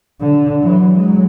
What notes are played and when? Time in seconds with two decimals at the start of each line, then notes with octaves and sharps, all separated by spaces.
0.20 D3
0.61 E3 F#3
0.97 F#3 G#3